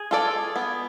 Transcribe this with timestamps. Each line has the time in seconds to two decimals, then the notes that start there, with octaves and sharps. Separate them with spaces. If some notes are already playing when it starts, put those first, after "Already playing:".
Already playing: G#4
0.11 F4 A4 D5
0.56 B3